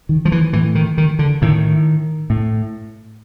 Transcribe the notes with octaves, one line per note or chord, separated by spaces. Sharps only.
D#3
F3
E3
A2 E3
D#3
D#3
D3
A2 D#3
A2